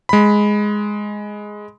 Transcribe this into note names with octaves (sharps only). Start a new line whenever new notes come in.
G#3 B5